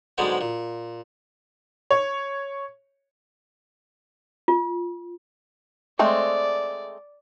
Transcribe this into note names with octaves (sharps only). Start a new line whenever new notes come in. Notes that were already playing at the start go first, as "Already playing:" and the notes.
G#2 D3 F#3 G#3 B3 C4
A#2
C#5
F4
G#3 A3 C4 D5